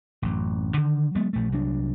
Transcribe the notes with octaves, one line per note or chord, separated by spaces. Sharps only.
A1 F#2
D3 D#3
F#3 G#3 A3 B3
A#1 A3
C2 F#3 D4